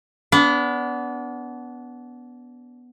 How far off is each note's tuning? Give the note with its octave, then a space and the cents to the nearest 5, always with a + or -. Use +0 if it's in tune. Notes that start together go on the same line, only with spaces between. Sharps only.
B3 +0 D4 -30